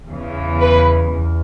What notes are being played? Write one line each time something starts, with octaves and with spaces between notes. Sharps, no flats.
E2 C#3 E3
B4
E2